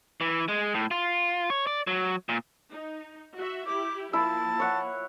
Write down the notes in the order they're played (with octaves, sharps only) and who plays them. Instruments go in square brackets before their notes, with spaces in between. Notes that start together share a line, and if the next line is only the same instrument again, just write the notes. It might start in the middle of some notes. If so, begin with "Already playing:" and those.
[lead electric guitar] E3
G#3
A2
F4
C#5
D5
F#3
A#2
[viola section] D#4
F#4 E5
[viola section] E4 G4 [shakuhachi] D6
[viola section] F3 A#3 [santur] E4 [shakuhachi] A5
[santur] C#5 F#5